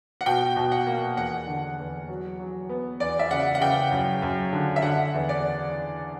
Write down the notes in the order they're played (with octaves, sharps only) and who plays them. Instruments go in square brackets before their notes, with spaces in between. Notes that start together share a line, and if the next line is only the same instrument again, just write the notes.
[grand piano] F#5
B2 G5
B2
F#5
A#3
E2 F#5
D3
E2
F#3
F#3
B3
E2 D5
E5
C#3 F#5
F#5
C#3 G5
F#2
F#2
D3
E5
D3 F#5
E2
D5